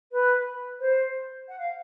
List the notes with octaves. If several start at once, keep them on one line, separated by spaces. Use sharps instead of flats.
B4
C5
F#5
F5